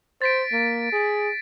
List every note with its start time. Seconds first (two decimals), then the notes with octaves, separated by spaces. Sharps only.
0.22 C5 A6 B6 D7
0.52 A#3
0.93 G#4